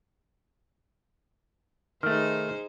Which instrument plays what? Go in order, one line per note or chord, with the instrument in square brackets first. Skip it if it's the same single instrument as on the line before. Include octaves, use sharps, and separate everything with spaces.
[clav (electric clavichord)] D#3 A3 [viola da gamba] D#4 G#4 C5 [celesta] F6